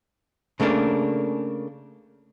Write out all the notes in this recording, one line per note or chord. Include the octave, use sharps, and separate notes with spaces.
C#3 A3 A#3 D4